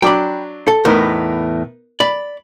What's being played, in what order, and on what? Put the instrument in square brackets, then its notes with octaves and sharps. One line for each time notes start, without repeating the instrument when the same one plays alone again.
[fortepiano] F#3 D4 D6 [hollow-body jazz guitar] G5 B5
[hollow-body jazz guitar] A4
[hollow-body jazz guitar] E2 A2 [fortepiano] B3 D#4 A#4
[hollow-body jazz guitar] D5 [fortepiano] B5